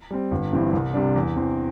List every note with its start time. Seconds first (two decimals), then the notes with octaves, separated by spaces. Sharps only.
0.11 G3 C4
0.31 G1
0.53 G2 E3 C4 E4
0.73 C2
0.94 C3 G3 D4
1.16 E2
1.36 E3 C4